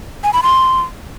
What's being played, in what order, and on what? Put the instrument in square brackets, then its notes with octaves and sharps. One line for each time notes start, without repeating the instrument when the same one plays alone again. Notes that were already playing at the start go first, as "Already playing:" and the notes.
[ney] G#5
B5
C6